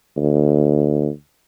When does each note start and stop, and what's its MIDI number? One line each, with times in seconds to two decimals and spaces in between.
0.17 1.09 38